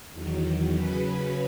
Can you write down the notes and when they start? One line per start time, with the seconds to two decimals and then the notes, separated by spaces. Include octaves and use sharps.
0.12 E2 D#3 F#3
0.74 C#3 F#3 C#4 B4 B5